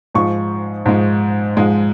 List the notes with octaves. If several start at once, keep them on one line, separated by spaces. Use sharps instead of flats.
G#2 F3 G#3 C#6
G#2 F3 G#3
G#2 F3 G#3